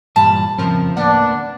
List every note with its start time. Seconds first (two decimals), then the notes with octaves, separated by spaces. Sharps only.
0.16 G2 A#2 E3 G3 A5 B5
0.58 F2 A2 C#3 F3 C4 A#4
0.97 D2 A#3 B3 D4 F#5